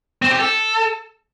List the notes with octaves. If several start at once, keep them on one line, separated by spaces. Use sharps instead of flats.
C4
G4
A4